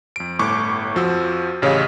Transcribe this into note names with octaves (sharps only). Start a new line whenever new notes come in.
F2 D7
G1 A2 C#6 D6
F2 F3 F#4 E6
A1 C#3 G4 C#5 D#5 F5